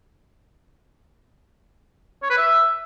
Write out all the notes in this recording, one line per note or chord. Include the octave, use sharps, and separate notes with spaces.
C#5
B4
E5